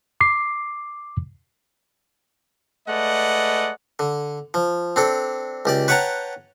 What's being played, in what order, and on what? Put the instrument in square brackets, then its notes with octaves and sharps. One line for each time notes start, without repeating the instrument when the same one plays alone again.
[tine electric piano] D6 C7
[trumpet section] G#3 A3 B4 D5 D#5 F#5
[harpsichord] D3
F3
C4 D4 A4
C#2 G4 D5
B4 C#5 F#5 G5 A5 A#5